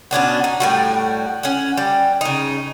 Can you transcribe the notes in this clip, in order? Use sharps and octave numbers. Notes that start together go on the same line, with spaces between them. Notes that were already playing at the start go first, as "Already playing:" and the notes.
B2 C#4 D4 F#4
D#4
A2 G3 F#4
C#4 F#5
G3
C#3 D#4